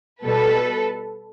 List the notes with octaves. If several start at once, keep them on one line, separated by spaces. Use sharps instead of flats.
B2 G3 A4 B4